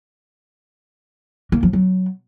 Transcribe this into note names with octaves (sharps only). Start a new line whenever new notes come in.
A#3
F3
F#3